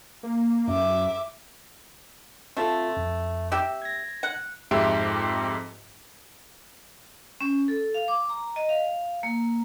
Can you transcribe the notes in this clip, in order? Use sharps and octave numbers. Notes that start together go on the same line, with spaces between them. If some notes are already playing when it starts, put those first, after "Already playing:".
A#3
F#2 E5 D6
A3 C4 F4 A4
F2
C4 G4 E5
G#6 A#6
F#5
F2 G#2 G4 E5 C6 D7
C#4
A4
F5
D6
A#5
D#5
F5
A#3